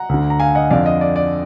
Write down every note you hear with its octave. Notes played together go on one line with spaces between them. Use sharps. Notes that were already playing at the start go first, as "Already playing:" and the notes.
Already playing: F#5 A#5
D2 D3
A#5
F5 G#5
D#5 F#5
F2 D3 D5 F5
D#5
D5
D5